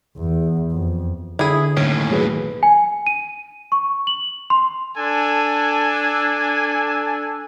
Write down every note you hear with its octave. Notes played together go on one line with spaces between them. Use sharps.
E2
F2
D3 E4 G#4
D#2 A2 C#4
F#3 G#4 B4
G#5
D#7
C#6
F#7
C6
D4 A4 G#5